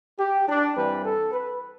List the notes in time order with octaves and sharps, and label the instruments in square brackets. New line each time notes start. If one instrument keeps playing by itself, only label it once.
[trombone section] G4
D4
G2 E3 G3 C4 B4
A4
B4